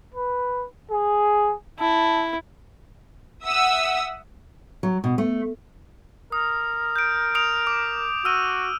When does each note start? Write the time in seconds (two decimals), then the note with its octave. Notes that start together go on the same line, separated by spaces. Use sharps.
0.14 B4
0.91 G#4
1.80 E4 A5
3.44 E5 F#5 D#6 E6
4.83 F#3
5.04 B2
5.18 A3
6.32 A#4 D#6
6.96 G6 D7
7.35 D#6 D7 F7
7.67 D6
8.25 F#4 E6 F6 D#7